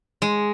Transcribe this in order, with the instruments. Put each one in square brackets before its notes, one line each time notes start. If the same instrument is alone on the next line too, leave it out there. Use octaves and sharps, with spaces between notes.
[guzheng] G#3